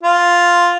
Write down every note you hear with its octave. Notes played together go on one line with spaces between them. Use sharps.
F4